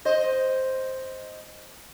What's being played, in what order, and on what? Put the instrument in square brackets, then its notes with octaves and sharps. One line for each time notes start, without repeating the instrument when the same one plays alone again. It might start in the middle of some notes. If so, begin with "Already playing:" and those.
[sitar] C5 D#5